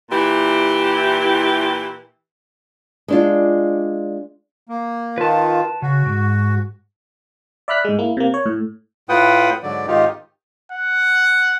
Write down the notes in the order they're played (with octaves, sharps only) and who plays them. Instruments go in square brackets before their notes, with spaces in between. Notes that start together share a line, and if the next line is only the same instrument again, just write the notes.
[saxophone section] A#2 E3 E4 G4
[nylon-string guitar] G#3 D4 F4
[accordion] A#3
[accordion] D#3 F4 [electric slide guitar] B4 A5
[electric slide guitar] C#3 [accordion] F#4
[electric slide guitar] G#2
[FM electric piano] D5 E5 B5 F6 F#6 B6
G#2 G#3
A#3 E4
C3 A#3
C#5
A2
[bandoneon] A2 F4 B4 F#5 G5 D#6
G#2 D3 F#3 D5
G#2 D#3 D#4 F4 G4
[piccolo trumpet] F#5